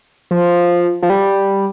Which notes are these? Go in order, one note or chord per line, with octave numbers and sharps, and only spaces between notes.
F3
F3
G3